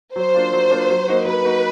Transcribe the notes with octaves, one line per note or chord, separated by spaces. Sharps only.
F#3 C5
A#3 D4 F4
F#3
A#3 D4 F4
F#3
A#3 D#4 F#4
F#3 B4
A#3 D#4 F#4